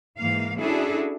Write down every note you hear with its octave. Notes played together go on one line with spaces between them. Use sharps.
G#2 E3 A#3 F5
C#4 D4 E4 F#4 G#4 A4